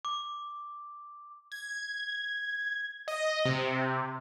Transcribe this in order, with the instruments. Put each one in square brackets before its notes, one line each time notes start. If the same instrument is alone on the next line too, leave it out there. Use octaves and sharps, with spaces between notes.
[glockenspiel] D6
[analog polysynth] G#6
D#5
C3